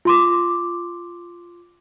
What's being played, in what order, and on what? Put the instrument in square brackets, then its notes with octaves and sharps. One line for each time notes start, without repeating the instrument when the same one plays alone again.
[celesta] F4 C6 D6